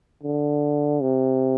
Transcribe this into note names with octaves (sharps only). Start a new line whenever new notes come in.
D3
C3